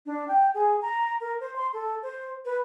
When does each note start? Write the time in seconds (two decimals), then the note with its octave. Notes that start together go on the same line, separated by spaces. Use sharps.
0.06 D4
0.28 G5
0.54 G#4
0.82 A#5
1.21 A#4
1.40 C5
1.56 C6
1.73 A4
2.02 C5
2.45 B4